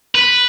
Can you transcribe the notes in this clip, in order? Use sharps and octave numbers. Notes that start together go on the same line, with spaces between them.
B4